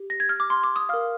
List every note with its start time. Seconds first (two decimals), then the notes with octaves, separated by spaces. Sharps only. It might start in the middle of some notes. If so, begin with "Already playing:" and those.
Already playing: G4
0.10 A#6
0.20 G#6
0.29 F6
0.40 D6
0.50 C6
0.64 D6
0.76 D#6
0.89 A#4 F5 F6